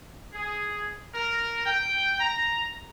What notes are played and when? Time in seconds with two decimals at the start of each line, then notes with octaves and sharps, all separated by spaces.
0.33 G#4
1.14 A#4
1.65 G5
2.19 A#5